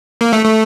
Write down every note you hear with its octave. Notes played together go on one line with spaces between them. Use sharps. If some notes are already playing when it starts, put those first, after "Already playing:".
A#3
A3
A3